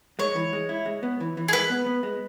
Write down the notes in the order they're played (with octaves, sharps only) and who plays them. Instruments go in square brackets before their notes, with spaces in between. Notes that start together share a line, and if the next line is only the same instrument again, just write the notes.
[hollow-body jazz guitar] G#3 [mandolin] C#5
[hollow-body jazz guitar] E3
G#3
E4
G#3
B3
E3
E3
[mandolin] G#4
[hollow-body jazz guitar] G#3 [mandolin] B4
[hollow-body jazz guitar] B3
B3
G#3